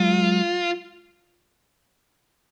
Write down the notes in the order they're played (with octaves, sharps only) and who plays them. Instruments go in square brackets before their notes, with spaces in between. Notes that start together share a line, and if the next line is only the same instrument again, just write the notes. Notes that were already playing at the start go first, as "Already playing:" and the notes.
Already playing: [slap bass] F#3 G#3 [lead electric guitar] F4